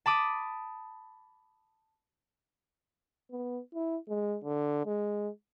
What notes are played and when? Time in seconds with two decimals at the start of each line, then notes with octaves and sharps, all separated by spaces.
0.06 A5 B5 D6 D#6
3.31 B3
3.75 E4
4.09 G#3
4.44 D3
4.86 G#3